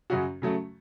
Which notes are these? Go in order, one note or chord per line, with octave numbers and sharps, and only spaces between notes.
F#2 C#3 F#3 C#4 F#4
C#3 F#3 A3